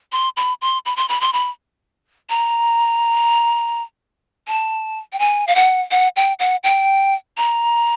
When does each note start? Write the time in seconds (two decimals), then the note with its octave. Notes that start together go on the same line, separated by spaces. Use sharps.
0.12 C6
0.37 B5
0.62 C6
0.86 B5
0.97 C6
1.09 B5
1.21 C6
1.33 B5
2.30 A#5
4.48 A5
5.13 G5
5.19 G#5
5.48 F5
5.55 F#5
5.91 F#5
6.16 G5
6.39 F#5
6.64 G5
7.37 A#5